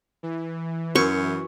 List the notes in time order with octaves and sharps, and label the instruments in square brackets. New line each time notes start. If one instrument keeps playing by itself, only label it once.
[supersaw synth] E3
[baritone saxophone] F#2 [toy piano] F#4 A#4 [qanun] C#6